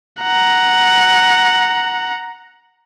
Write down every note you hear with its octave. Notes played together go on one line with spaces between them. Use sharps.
F#5 A#5